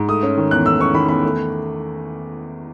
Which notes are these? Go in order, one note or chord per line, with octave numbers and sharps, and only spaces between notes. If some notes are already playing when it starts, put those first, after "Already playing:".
Already playing: G#2
A3 D#6
C#4
D#3
E2 F#6
A3 E6
C#4 C#6
D#3 B5
E2 B5
A3